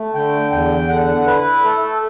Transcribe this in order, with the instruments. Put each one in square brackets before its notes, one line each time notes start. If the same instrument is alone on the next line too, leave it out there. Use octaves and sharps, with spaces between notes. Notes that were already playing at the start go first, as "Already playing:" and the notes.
Already playing: [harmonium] A3
D3 G5
E2 G5
D3 F#5
E4 B4
A3 A4